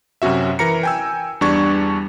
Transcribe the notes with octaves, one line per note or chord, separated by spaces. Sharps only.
F#2 C3 C#4 F#4 E5
E3 A#4 A#5 C#7
G5 G#5 E6
E2 G3 D4 C#6 G#6